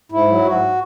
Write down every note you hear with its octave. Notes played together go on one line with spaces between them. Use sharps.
G#2 E4
F#3
G#2 F#4